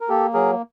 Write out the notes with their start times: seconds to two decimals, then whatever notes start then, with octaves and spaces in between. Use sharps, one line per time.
0.01 A#4
0.09 A#3 G4 A4
0.34 F#3 G#4 A#4